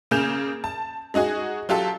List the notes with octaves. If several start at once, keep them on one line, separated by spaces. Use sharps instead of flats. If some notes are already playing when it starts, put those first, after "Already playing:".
C#3 A#3 G#4 G6 E7 F7
A5
G#3 D#4 F#4 G#4
F#3 F4 G4 A4